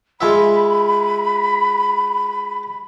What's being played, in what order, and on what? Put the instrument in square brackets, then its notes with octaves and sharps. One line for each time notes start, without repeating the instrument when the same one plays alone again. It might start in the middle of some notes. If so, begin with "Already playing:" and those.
[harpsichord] G#3 F4 E5 [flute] B5